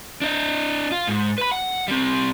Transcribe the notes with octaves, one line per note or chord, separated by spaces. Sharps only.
D4 D#5
F4
G#2
B4 B5
F#5
G3 C4